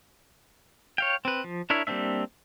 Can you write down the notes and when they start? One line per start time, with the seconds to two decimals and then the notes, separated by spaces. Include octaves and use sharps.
0.98 C#5 F5 G5
1.25 C4 B4
1.44 F3
1.70 D4 E4 A#4 C#5 E5
1.87 G3 A#3 C4 D4 E5